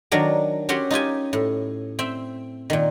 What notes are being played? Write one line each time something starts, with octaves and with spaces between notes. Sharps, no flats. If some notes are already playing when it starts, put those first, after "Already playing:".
D#3 F#3 D4 A#4
C#4 F#4 G4 F#5 C6
D#4 F4 G4 G#5
A2
C4 E5 G5
A#2 D#3